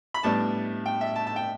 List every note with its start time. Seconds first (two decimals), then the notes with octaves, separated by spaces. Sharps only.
0.14 B5
0.23 A2 G3 B3 D4 A5
0.86 G5
1.01 E5
1.16 A5
1.27 A5
1.36 G5